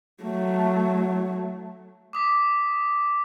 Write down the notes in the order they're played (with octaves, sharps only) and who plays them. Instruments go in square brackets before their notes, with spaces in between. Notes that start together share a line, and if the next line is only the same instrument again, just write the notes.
[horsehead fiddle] F#3 A3
[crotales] D6 D#6 B6